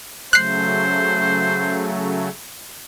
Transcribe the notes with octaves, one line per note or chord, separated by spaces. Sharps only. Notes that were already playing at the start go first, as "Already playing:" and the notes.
C#3 F#3 A3 C5 F#6 C7